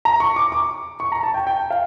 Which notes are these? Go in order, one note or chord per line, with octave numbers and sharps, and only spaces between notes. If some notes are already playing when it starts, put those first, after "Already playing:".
A#5
C#6
D6
D6
C#6
A#5
A5
G5
G5
F5